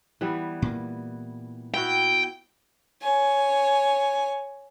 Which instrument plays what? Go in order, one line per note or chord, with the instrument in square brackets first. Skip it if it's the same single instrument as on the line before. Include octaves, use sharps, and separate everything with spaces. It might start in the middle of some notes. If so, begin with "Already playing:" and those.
[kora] E3 G3 B3
[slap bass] A#2 A#3
[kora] B3 E4 F#4 [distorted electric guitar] G5
[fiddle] C#5 G#5